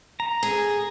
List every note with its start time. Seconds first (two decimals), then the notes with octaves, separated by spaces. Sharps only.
0.20 A#5
0.43 G#4